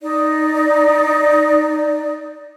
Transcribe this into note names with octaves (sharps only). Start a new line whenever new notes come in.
D#4 D5